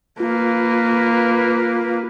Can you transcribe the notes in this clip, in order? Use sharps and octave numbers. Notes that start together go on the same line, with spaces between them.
A#3 F4 B4